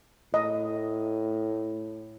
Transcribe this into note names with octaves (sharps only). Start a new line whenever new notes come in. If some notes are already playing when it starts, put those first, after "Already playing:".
A2 D#5